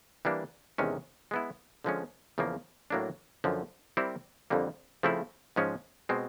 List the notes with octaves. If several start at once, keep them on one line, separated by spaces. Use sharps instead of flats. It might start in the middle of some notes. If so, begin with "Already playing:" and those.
E3 G3 A#3 D4
E2 C3 D#3 G#3 C#4
G#3 B3 E4
D3 F3 G#3 C#4
E2 C#3 F3 A#3
A2 F#3 A#3 D4
F#2 D3 F3
G3 C4 E4 G4 A#4
F2 D3 G3 A#3
C#3 F3 A3 C4 E4
G#2 F3 G#3 C#4
B2 G#3 C4